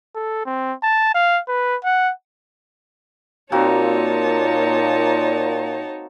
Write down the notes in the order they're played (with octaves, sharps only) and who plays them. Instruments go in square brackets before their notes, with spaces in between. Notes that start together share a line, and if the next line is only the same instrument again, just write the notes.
[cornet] A4
C4
A5
F5
B4
F#5
[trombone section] A#2 [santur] A#3 C4 F#4 [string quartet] D#4 C#5 A5